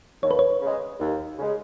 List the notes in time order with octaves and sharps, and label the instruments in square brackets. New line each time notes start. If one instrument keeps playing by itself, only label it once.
[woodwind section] D#2 [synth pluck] C#5
[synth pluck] B4
C#5
[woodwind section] C#3 G#3
D#2
C#3 G#3